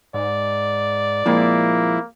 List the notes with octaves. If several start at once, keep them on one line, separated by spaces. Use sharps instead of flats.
G#2 D5
F2 A#2 G#3 A#3 E4